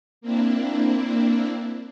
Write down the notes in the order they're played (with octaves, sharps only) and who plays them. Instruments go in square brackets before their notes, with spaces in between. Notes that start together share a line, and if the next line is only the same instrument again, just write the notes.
[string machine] A#3 C4 D4 E4